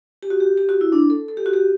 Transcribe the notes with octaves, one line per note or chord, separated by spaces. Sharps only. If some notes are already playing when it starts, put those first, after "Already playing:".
G4
F#4
G4
G4
F#4
E4
D4
A4
A4
G4
F#4
G4